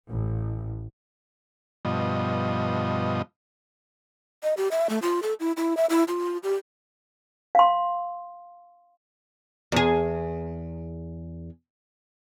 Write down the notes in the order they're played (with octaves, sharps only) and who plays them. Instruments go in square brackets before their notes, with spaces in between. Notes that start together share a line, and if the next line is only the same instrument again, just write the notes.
[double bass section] A1
[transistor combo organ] G2 B2 F3 D#5
[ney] D#5
G4
E5
A3
F4
A4
E4
E4
E5
E4
F4
G4
[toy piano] F5 C6
[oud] E2 G#4